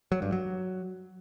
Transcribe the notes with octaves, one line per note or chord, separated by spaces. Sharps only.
F#3
G2
F#3